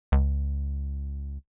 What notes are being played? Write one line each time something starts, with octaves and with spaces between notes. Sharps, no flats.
C#2